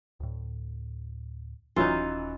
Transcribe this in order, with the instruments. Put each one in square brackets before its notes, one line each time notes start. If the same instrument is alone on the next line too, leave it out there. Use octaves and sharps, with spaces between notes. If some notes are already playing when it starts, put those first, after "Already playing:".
[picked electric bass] D2 A2
[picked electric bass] D#1 C#4 [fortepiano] E3 F#3 [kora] D#4 F4